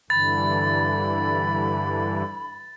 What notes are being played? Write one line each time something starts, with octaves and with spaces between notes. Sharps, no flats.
G2 D3 E3 B5 A6